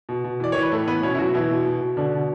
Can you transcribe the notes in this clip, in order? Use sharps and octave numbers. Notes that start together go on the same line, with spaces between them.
B2
B2
E3 D5
E3 C#5
B4
A2 A3 A4
E3 B3 B4
B2 C#4 C#5
E4
B2 F#3 F#4
B2 E3 E4
B2
B2
B2
B2 D3 D4
B2